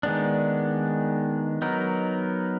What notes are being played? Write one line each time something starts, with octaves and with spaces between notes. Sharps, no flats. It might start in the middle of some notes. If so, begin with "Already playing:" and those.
D#3 G#3 B3 D4
F#3 B3 D#4 A#4